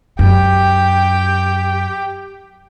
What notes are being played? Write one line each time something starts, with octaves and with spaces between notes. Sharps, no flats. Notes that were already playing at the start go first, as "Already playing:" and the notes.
F#2 G4 G5